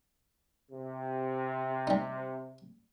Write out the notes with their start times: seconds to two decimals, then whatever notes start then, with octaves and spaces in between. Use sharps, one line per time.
0.72 C3
1.87 G3 D#4